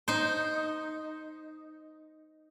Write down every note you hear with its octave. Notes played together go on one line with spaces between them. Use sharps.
D#4 C5